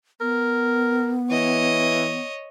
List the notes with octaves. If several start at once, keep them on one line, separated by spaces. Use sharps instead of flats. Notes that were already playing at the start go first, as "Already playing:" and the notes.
B3 A#4
E3 C#5 D#5